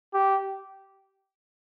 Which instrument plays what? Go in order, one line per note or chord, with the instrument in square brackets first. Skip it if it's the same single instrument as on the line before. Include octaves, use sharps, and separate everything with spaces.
[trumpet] G4